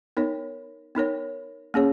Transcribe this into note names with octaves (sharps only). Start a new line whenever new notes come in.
B3 D#4 A#4 C#5
B3 D#4 A#4 C#5
A#3 C#4 G#4 C#5